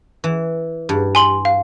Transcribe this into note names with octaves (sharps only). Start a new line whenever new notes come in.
E3
G2
G#5 C6 F#7
F5